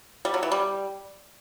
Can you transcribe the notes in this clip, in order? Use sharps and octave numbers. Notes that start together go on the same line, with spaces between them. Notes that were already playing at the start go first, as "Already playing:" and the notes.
G3
F#3
E3
G3